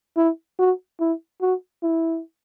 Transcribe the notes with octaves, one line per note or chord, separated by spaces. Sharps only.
E4
F#4
E4
F#4
E4